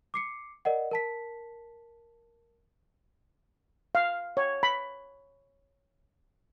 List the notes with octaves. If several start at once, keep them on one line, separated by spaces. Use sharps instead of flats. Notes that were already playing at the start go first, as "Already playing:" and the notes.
D6 C7 C#7
A#4 D5 D#5 F#5
A#4 A5 B6
F5
C#5
B5